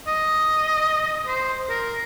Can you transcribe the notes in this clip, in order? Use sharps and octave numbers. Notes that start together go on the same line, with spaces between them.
D#5
C5
A#4